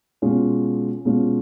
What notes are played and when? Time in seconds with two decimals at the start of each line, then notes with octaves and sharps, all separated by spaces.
0.22 B2 G#3 C#4 F4
1.05 B2 G#3 C#4 F4